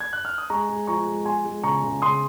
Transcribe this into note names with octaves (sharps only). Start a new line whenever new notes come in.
G#6
F#6
F6
D#6
G#3 A#5 C#6
G#3
F3 A#5 C#6
G#3
G#3 G#5 C6
G#3
C#3 A#5 C#6
C#3
C#3 C6 D#6